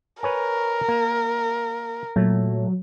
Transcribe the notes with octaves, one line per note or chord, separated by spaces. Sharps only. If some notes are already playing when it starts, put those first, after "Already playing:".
A#4 B4 C#5 G#5
A#3
A#2 F#3 A3